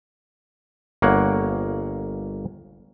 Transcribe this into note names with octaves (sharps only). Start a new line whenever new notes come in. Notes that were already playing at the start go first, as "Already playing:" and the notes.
G1 A#3 C#5 F#5